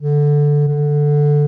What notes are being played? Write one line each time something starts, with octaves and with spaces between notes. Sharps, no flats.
D3
D3